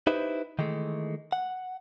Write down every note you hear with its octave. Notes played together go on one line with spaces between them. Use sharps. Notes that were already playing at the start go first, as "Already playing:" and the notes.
D#4 E4 G4 B4 C5
D#3 E3 G#3 A3
F#5